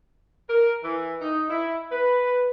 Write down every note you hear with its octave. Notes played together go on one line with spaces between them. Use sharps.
A#4
E3
D#4
E4
B4